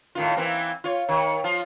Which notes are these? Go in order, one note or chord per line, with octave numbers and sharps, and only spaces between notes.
A2 D#3 F4
E3 A#3 C4
F4 C#5
D#3
F3 F4